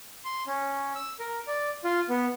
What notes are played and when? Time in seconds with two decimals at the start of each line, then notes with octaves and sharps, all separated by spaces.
0.24 C6
0.47 C#4
0.95 E6
1.20 A#4
1.47 D5
1.84 F4
2.09 B3